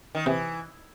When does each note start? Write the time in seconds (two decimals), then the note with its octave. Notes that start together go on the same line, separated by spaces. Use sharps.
0.15 D#3
0.26 C3 E3